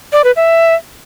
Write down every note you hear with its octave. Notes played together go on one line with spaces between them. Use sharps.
D5
B4
E5